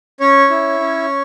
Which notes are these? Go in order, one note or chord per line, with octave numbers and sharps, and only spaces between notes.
C#4 C#5
E4
C#4